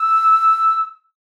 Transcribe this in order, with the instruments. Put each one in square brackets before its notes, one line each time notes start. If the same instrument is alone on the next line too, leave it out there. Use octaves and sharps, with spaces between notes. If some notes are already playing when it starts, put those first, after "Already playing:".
Already playing: [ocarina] E6